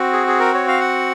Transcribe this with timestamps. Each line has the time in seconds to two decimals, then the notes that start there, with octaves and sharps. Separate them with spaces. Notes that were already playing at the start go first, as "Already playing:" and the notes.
Already playing: C4 F#4
0.13 G#4
0.27 G#4
0.40 A#4
0.54 C#5
0.68 F5
0.80 F#5